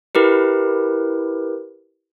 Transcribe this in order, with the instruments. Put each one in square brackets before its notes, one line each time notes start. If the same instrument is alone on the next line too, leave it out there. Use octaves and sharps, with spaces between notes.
[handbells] E4 G4 A#4 B4